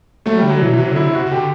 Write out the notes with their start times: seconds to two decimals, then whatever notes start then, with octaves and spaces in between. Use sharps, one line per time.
0.26 F#3 A3
0.38 G3
0.43 D3
0.50 F#3
0.61 B2 E3
0.73 E3
0.79 C3 F#3
0.91 D3 E4
1.06 C3
1.14 F#4
1.26 C3
1.31 D3 G4